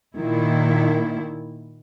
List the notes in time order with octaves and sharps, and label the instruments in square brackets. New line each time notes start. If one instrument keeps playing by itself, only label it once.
[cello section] A#2 D#3 E4